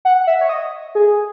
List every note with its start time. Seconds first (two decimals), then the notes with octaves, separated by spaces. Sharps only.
0.05 F#5
0.27 E5
0.41 C#5
0.49 D#5
0.95 G#4